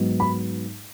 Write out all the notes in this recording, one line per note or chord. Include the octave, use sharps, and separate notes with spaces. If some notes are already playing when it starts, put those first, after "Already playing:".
Already playing: G#2 F#3 B3 D#4
B5